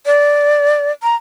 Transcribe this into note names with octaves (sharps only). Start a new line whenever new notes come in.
D5
A#5